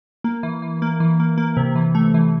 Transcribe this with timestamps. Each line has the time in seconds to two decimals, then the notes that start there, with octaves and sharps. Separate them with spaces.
0.24 A#3
0.43 E3
0.62 E3
0.82 A#3
1.00 E3
1.20 A#3
1.38 A#3
1.57 C3
1.75 E3
1.95 A3
2.14 E3